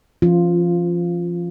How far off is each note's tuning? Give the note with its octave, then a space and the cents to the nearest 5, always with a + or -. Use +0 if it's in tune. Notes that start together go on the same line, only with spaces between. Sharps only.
F3 -30 C#4 -10 F4 +0